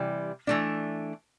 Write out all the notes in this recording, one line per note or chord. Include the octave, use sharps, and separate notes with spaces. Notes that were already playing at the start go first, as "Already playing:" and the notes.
Already playing: C3 E3 G3
E3 A3 D4